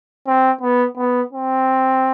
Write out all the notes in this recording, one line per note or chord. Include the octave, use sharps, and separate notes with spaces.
C4
B3
B3
C4